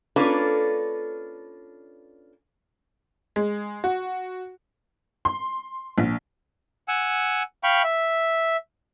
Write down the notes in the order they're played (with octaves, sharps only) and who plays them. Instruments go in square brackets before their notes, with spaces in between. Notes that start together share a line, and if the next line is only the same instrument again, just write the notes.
[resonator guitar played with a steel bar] A#3 C#4 D4 F4 A4 B4
[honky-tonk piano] G#3
F#4
C6
A#1
[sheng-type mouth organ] F#5 G#5 E6
F5 G5 B5 C#6
E5